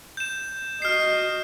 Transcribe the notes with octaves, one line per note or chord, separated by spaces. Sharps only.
G6 E7
F#4 D#5 F6 C7